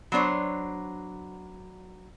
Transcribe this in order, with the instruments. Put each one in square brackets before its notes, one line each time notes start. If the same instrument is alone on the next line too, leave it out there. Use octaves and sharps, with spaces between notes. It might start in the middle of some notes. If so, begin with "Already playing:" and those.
[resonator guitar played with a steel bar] F#3 B3 D4 C5 C#5